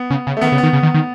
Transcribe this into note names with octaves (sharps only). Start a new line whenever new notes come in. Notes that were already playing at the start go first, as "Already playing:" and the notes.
Already playing: B3
C#3
C#3
A3
D#3 B3
C#3
B3
D#3
C#3
D#3
D#3